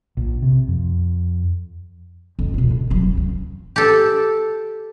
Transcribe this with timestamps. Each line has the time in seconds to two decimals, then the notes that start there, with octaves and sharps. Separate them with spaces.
0.17 A#1
0.42 C3
0.68 F2
2.39 F2
2.54 B2 F4
2.70 D3
2.90 F#3 G3
3.03 G1
3.17 C#3
3.76 G4 A4